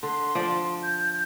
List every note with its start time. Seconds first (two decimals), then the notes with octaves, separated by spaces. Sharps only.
0.03 D3 C6
0.35 F3 D5
0.83 G6